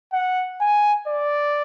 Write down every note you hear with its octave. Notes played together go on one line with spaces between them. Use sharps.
F#5
G#5
D5